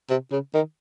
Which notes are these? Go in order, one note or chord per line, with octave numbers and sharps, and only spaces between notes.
C3
C#3
D#3